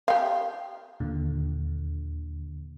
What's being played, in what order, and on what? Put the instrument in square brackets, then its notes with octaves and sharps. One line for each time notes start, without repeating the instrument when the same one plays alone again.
[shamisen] G4 F5
[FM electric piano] D#2 A#2 D3